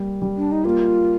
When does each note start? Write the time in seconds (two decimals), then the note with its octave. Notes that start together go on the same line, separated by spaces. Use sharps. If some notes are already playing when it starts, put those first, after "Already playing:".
Already playing: G3 A#3
0.22 G3
0.37 D4
0.52 D#4
0.64 A#3 F4